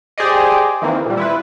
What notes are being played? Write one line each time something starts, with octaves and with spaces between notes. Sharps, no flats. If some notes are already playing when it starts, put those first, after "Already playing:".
G4 G#4 C5 D5 D#5
D#3 E3 A#3 C4
A#2 G3
E4 F4 B4